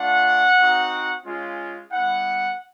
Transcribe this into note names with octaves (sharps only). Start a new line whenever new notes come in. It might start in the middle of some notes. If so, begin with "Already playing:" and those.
Already playing: A3 D4 F4 F#5
C4 D#4 F#4
G#3 C#4 F4
G3 B3 E4 F#5